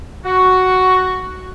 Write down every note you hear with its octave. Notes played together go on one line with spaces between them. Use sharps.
F#4